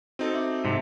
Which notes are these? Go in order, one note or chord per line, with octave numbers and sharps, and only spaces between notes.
C4 D#4 F#4 A4
E5 D6
G#2 C3